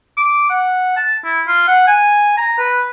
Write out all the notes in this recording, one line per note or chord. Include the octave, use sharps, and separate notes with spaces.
D6
F#5
A5
E4
F4
F#5
G#5
A#5
B4